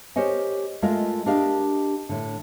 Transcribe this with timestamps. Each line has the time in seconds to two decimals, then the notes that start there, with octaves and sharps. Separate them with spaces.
0.16 G4 A#4 C5 C#5 D#5 G#5
0.82 G#3 A3 F4 A#4 D#5 F5
1.26 D4 G4 A#4 D#5 F5
2.09 A2 D3